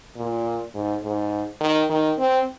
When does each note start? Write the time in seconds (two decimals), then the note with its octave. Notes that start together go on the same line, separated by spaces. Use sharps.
0.16 A#2
0.74 G#2
1.02 G#2
1.60 D#3
1.89 D#3
2.19 C4